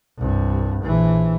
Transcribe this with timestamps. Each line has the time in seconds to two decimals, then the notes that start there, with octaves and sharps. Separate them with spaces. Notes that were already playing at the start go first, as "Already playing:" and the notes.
0.18 C2 G2
0.84 A#1 E3